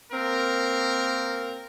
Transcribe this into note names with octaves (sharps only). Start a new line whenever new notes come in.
A#3 C4 A#4